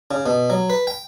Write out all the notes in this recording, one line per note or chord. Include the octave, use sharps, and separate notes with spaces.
C#3
B2
F#3
B4
G5